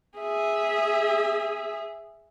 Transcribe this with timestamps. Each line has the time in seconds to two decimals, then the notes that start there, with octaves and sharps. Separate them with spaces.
0.19 G#4 E5